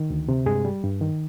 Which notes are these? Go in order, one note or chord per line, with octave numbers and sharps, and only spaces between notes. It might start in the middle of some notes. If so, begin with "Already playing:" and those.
Already playing: D#3
D2
C3
G2 G#3 G#4
G3
G2
D#3